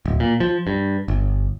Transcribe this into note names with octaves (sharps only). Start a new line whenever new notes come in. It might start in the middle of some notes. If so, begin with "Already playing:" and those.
D1
A#2
F3
G2
G1